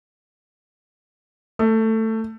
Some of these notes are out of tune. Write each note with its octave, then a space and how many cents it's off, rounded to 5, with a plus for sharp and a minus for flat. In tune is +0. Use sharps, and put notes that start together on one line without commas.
A3 +15